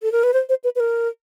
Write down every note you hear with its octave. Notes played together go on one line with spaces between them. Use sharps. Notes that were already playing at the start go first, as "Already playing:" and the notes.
A4
A#4
B4
C5
C5
B4
B4
A#4